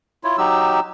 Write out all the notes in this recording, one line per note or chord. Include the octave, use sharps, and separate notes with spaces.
E4 F4 C#5
F#3 D#4 G4 E6